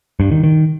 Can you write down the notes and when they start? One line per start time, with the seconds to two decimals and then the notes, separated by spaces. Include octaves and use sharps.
0.20 G2
0.32 D#3
0.44 D#3